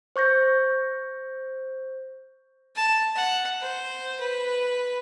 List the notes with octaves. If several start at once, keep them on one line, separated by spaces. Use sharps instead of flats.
C5 C#6 G6 A#6
A5
F#5
C5
B4